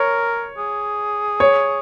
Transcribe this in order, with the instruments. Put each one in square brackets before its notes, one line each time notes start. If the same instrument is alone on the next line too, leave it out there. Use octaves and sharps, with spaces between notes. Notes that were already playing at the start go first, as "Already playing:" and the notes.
Already playing: [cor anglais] A#4 [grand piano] C#5
[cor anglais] G#4
[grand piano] C#5